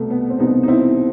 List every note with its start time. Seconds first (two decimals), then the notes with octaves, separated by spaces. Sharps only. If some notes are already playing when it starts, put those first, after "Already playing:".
Already playing: C2 B2 A3 B3
0.10 B3
0.30 C4
0.39 C2 B2 B3 D#4
0.63 D#4
0.68 C4 E4